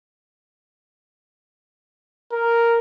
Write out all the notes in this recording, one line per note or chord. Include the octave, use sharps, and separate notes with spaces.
A#4